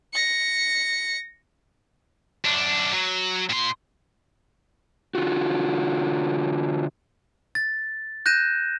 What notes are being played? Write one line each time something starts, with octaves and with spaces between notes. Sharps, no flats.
A#6 C#7
F#2 D4
F#3
A#2 C6
D3 F4 F#4
A6
F#6 G6 A#6 D#7 E7